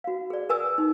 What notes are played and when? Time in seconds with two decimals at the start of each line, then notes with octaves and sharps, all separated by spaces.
0.04 F#4 F5
0.30 G#4 D5
0.49 A#4 B4 G#5 D6 E6
0.78 D#4